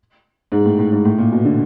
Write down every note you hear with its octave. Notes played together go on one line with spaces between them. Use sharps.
G#2
A2
A2
G#2
A2
A#2
B2
D3